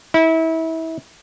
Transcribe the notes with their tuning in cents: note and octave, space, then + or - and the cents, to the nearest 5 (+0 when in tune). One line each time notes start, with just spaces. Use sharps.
E4 -30